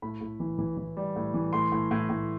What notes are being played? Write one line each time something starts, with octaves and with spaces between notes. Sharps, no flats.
A2 B5
A2
E3
E3
E3
G3
A2
E3
A2 C6
A2
A2
A2